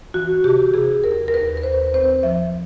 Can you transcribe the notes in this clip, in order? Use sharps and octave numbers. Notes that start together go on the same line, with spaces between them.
E3 F#4
C3 G4
C3 G#4
D#2 A#4
A#4
D#2 B4
B4
D#2 C5
C4 C5
F3 E5